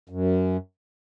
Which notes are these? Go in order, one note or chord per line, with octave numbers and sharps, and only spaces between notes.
F#2